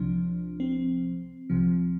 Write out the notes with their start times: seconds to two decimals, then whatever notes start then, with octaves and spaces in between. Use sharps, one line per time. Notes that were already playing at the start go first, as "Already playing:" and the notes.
Already playing: C2 C3 F3 D4
0.60 C4
1.50 C2 C3 F3